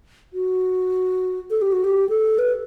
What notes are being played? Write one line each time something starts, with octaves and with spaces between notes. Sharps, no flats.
F#4
A4
G4
F#4
G4
A4
B4